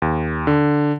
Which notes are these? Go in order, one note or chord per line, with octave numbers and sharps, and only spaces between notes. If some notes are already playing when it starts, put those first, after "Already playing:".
D#2
D3